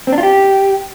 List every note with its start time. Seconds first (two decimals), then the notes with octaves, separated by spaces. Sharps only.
0.07 C4
0.13 D4
0.18 F4
0.23 G4